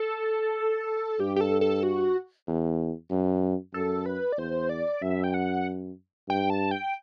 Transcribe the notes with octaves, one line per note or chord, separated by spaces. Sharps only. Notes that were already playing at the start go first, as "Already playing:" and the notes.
Already playing: A4
G2 G4
G4
A4
A4
F#4
E2
F#2
F#2 A4
B4
D5
E2 C5
D5
F#2 E5
G5
F#5
G2 G5
A5
G5